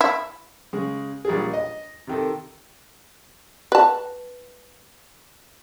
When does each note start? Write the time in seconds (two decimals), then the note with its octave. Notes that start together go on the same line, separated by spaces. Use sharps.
0.01 E4
0.73 C#3 G#3
1.25 A#1 G3 G#4
1.53 D#5
2.07 C3 D#3 A4
3.72 B4 A5